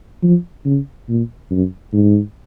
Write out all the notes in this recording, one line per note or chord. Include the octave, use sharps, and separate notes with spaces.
F3
C#3
A#2
F#2
G#2